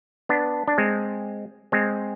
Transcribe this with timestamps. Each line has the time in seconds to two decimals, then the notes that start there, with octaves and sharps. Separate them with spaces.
0.29 B3 D4
0.68 D4
0.78 G#3 C4
1.72 G#3 C4